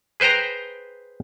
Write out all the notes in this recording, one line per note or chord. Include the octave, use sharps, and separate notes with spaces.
G#4 B4 C5 G5 A#5